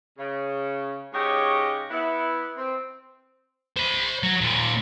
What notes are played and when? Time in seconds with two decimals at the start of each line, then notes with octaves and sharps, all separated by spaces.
0.18 C#3
1.13 G#2 C#3 G4 C#5 D#5
1.91 B3 E4
2.57 C4
3.77 C5 B5
4.23 F#3
4.41 D#2 A#2